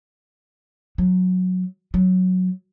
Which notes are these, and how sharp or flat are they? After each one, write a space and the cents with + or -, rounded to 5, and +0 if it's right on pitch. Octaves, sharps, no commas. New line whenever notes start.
F#3 -10
F#3 -5